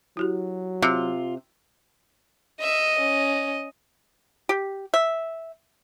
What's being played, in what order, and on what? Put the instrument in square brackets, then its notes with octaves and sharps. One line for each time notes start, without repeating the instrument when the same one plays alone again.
[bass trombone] F#3 [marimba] E4 F#4 G4
[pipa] C3 [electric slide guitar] F4
[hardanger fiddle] D#5 [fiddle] E5
[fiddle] C#4
[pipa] G4
E5